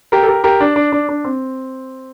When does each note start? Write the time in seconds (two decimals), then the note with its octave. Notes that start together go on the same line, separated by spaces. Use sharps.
0.12 G4 A#4
0.23 A4
0.28 G4 A#4
0.44 G4 A#4
0.61 D4
0.76 D4
0.92 D4
1.09 D4
1.24 C4